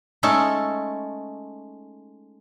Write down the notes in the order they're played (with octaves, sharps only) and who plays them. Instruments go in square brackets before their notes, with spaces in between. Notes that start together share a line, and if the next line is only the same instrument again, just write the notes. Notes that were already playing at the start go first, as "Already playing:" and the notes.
[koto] G#3 A3 C#4 D#4 A4